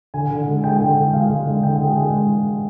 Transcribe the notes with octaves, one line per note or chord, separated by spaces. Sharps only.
D3 G#5
D3
G#3
G#3 G5
D3
D3
G#3 F5
G#3
D3
D3 G5
G#3
G#3